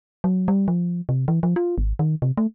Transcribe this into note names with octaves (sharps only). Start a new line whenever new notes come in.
F#3
G3
F3
C3
E3
F3
F4
G#1
D#3
C3
A3